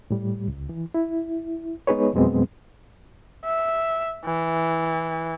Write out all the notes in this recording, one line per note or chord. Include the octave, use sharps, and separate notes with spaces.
A2 G3
C#2
E3
E4
G#3 B3 D#4 G#4 B4 C#5
F2 B2 F#3 G#3 B3 C4
E5
E3